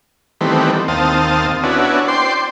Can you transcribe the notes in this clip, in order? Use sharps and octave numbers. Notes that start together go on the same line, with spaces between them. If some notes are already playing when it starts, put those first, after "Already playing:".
D#3 E3 G3 A3 B3 C4
D#2 C4 F5 A5 D#6
B3 C#4 D4 E4 F#4
C5 D5 G5 C6